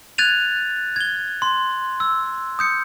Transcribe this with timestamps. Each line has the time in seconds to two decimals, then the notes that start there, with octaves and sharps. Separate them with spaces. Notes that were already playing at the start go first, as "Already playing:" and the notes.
0.18 F#6 G#6 A6 D#7 F7
0.96 G#6 G7
1.42 C6
2.00 E6
2.59 D#6 G6 C#7